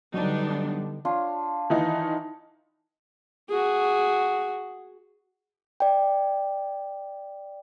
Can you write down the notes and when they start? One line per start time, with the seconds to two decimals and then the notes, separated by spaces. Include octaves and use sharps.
0.14 D3 F#3 G3 B3 D4 D#4
1.05 D4 F4 C#5
1.70 D#3 E3 D#4
3.49 F#4 G#4
5.80 D5 G5